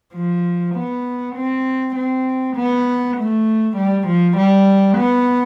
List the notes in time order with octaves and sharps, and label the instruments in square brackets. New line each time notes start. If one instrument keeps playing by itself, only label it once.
[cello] F3
B3
C4
C4
B3
A3
G3
F3
G3
B3